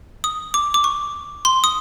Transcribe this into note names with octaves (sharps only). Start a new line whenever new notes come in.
D#6
D6
D6
C#6
C6
D#6